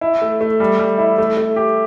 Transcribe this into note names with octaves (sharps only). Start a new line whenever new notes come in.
E4
A3
A3
G3
G3
E4
A3
A3
G4